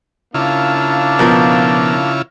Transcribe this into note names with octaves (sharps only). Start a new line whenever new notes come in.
C#3 A#3 D4 E4 F4
B2 F3 A#4